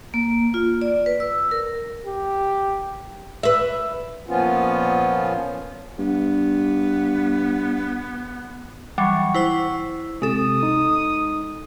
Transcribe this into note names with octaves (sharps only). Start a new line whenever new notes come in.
A#3
F4
D5
B4
E6
A#4
G4
B4 E5
A#2 F3 B3 C#4 F4
G2 B3
E3 F#3 G3 F#5 C#6
E4 C5 E6
C3 G#3 A4 D#6
D#4